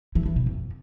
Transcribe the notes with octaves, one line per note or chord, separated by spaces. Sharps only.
E3
E3
B2
F2